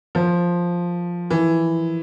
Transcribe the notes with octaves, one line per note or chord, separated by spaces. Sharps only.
F3
E3